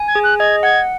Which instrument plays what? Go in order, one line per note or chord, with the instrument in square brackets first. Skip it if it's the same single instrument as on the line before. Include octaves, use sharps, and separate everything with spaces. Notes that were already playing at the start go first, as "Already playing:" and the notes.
Already playing: [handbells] G#5
[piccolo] G#6
[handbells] G#4
[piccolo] F#6
[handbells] D#5 [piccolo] G#6
[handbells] F#5 [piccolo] G#6